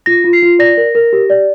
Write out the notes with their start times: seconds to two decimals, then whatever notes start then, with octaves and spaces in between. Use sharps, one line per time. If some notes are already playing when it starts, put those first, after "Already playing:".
0.06 F4 A#6
0.24 F4
0.33 C7
0.42 F4
0.59 D5 A#6
0.77 A#4
0.95 A#4
1.13 G4
1.30 D5